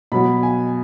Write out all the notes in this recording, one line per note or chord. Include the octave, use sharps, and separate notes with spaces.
B2 F#3 B5
G#5